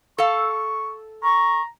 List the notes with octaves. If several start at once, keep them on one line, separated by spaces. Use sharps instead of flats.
A4 F5 C#6
A#5 C#6